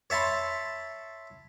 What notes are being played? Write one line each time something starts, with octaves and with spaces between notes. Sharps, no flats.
C#5 E5 A5 B5 C6